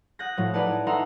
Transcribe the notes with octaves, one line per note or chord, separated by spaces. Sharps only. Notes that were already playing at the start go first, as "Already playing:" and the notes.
F#5 D#6 F#6 G6 A6 A#6
A2 F3 F#3
D#4 G#4 B4 D5 F#5 A5
D#4 A4 E5 F#5 A#5 C6